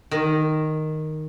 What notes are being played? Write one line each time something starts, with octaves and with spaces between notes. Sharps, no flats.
D#3